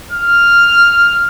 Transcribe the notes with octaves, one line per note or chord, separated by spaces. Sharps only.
F6